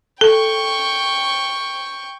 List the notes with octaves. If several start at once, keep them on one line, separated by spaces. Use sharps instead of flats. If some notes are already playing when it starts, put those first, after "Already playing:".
A4 G5 C#6